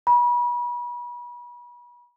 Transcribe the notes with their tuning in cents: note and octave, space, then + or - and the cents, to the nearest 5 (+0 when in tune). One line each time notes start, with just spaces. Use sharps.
B5 -35